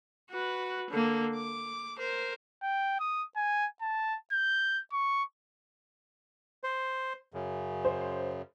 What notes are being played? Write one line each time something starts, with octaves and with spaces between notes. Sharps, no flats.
F#4 B4
D3 A#3
D6
A#4 C5
G5
D#6
G#5
A5
G6
C#6
C5
F#2 C#3
C5